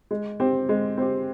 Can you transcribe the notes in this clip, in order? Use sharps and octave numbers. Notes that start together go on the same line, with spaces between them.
G#3
C4 G4
G#3
C4 G4